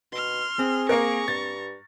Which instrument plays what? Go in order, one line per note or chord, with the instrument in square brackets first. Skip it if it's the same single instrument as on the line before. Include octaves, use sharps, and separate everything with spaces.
[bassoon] B2 [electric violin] C6 F6
[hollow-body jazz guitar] C4 [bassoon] G#4
[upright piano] A#3 A#4 [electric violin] A#5 C#6
[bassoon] G2 [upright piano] A6